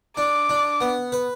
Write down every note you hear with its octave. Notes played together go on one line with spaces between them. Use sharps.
D4 D6
D4
B3
B4